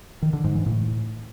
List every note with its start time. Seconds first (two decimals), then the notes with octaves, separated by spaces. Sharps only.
0.22 D#3
0.33 D3
0.44 G#2
0.55 E3
0.66 A2